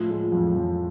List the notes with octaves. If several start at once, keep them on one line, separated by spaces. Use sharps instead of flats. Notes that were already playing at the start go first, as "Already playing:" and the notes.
Already playing: A2 F3
G#3
F2
F2